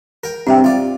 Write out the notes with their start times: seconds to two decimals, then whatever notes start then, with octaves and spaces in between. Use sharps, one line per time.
0.24 A#4 G5
0.47 G2 C3 C4 E5 G5
0.64 F4 D5